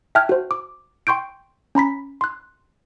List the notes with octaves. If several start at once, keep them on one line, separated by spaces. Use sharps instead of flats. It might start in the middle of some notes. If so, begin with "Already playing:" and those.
E5 G5 A5 F6 F#6 G#6
F#4 C5
D6
G5 C6 C#6 G6 D7
C#4 A#5 B5 B6
C6 F#6